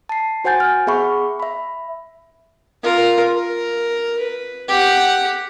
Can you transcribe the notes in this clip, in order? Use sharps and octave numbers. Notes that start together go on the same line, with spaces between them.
A5 C7
F#4 C5 F#5 G#5 G6 A6
F6
B3 G#4 E5 F#5 B5 C#6
E5 B5
F4 A#4
A#4
B4
G4 F#5